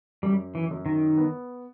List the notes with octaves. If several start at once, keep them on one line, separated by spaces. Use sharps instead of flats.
F#2 G3
E3
F#2
D#3
B3